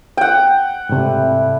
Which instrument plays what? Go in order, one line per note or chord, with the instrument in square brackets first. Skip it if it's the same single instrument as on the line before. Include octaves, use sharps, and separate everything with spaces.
[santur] F#5 G5
[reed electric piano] G#2 C3 [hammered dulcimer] G3 A3 E4